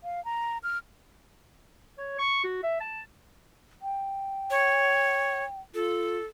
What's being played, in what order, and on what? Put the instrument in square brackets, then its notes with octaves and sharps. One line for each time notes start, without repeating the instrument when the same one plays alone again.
[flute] F5
A#5
F6
[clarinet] C#5
C#6
F#4
E5
A5
[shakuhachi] G5
[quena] C#5
[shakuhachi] F4 [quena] A4